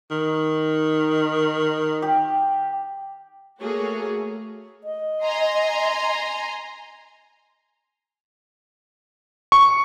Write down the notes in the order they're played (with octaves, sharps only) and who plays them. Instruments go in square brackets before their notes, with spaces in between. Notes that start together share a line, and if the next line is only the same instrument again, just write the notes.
[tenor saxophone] D#3
[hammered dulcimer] G4
[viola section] A3 A#3 F#4 G#4 C#5
[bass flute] D#5
[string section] G#5 A#5 C6
[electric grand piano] C#6